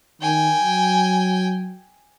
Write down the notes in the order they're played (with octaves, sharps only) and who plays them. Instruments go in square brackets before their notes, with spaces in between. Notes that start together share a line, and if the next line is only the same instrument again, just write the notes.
[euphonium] D#3 [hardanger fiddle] G5 G#5
[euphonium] F#3